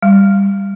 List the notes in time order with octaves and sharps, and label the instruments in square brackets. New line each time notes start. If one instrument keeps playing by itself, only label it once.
[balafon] G3